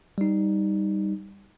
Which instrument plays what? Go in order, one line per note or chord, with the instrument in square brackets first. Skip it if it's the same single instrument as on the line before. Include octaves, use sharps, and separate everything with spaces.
[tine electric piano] G3 D#4